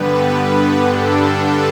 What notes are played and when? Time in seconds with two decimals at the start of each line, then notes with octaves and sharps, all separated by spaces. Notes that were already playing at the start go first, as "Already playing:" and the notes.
Already playing: G2 D3 G3 B3 B4
0.84 G2 D3 G3 D4 A4
1.39 B4